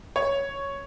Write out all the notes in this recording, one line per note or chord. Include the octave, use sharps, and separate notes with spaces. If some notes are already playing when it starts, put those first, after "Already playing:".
C#5